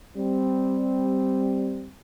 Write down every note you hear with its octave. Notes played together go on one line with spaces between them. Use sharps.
G3 C4